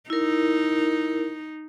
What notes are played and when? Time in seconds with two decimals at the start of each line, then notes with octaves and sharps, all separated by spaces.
0.10 D#4 E4 A#4